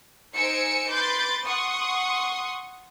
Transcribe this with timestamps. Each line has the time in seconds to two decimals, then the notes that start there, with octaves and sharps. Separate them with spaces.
0.34 D#4 C5 G#5 E6 C#7 D7
0.89 B4 C6 D6 G6 A6
1.44 F#5 C6 C#6 D#6